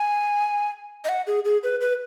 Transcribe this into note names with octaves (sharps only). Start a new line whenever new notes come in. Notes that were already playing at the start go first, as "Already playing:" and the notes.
Already playing: G#5
D#5
F#5
G#4
G#4
B4
B4